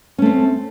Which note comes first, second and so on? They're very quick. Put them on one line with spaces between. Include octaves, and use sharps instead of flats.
C#4 A3 C4